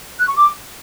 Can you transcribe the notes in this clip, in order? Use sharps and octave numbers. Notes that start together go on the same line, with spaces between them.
F#6
C#6
D6